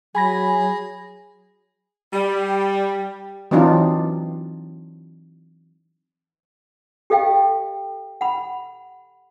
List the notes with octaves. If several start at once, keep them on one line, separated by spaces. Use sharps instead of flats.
F#3 G#4 G#5 B5 A#6
G3
E3 F#3 C4 D4 D#4 F4
G4 A4 D#5 F5 G5
F#5 B5